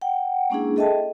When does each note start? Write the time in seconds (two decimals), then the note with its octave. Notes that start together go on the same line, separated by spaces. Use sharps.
0.01 F#5 G5
0.50 G#3 A#3 C#4 D4 E4 G#4
0.76 G#4 A4 D#5 E5 G5 A5